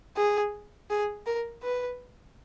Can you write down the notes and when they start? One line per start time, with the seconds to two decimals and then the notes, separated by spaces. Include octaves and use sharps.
0.17 G#4
0.90 G#4
1.26 A#4
1.63 B4